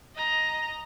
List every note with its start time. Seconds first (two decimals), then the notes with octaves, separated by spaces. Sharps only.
0.15 D#5 A#5